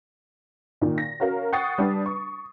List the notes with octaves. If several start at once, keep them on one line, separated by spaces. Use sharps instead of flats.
A#2 D#3
A#6
C#4 F#4 A#4 F5
F#5 G5 C#6 D#6 A6 C7
G3 D4 B4
C#6